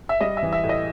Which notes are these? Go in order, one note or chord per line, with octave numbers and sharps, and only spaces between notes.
E5
G3 D#5
E5
E3
E5
A2
D#5